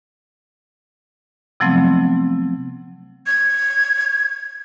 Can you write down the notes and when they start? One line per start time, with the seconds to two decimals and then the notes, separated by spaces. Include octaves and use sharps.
1.60 C3 F3 F#3 A3 B3 C4
3.26 G#6